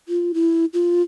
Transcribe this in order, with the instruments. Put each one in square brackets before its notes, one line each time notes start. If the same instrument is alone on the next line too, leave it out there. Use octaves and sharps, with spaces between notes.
[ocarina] F4
E4
F4